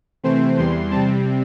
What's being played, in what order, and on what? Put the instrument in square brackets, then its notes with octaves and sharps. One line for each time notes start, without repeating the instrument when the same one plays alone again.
[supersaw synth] C3 E3 A3 C4 C5
E2 E3 G3 C6
C3 G3 C4 A5